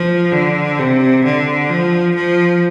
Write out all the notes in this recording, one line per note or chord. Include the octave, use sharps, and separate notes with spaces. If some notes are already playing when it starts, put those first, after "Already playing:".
Already playing: F3
D3
C3
D3
F3
F3